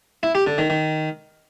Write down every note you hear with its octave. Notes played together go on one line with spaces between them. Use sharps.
E4
G4
D3
D#3
D#3